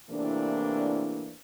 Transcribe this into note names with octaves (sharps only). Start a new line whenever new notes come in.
A2 C3 E3 A#3 D4